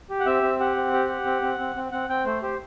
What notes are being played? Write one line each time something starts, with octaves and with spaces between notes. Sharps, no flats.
G4
F#5
C4 E5
C4
G4 F#5
C4
G4
G4
C4
C4
C4
C4
C4 F#5
C4 G5
A3 C5
G4 C5